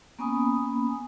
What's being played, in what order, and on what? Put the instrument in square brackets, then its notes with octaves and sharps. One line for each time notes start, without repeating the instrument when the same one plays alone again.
[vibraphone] A#3 B3 C#4 G#5 B5 D#6